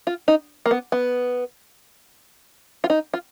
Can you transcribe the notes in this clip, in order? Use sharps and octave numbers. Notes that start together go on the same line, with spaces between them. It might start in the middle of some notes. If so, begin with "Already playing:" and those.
F4
D#4
A#3
B3
B3
F4
D#4
F4